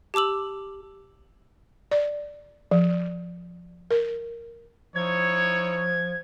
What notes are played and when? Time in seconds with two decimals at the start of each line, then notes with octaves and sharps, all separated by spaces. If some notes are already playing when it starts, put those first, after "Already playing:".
0.14 G4 A5 D6 E6 F#7
1.91 D5
2.71 F3
3.91 A#4
4.96 F3 D#4 E4 C#5 G#6